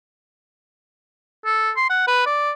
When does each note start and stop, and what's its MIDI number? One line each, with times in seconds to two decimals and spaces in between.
1.46 1.71 69
1.77 1.86 84
1.90 2.03 78
2.07 2.22 71
2.26 2.51 74